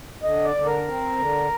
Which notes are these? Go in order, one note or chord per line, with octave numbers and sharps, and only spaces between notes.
D3 D#5
D5
D3
A#4
C4
D3